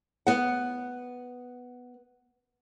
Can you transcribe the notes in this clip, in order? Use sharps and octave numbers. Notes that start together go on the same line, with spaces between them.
B3 F#5